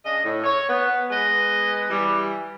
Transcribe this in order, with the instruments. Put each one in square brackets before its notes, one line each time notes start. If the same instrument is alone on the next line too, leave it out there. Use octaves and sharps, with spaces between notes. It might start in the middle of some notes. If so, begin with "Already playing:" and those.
[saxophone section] C#3 D4 D#5
A2
C#5
B3
G#3 B3 B4 D#5
E3 G3